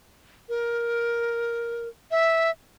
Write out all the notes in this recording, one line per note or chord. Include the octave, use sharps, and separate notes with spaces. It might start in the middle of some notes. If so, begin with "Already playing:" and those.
A#4
E5